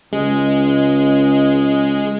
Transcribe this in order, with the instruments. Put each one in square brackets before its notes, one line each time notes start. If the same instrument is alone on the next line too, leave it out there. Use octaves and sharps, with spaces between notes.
[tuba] C#2 [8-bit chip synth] G#3